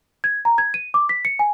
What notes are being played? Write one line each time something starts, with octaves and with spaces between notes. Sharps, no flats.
G#6
A#5
G#6
D#7
D6
B6
C#7
G#5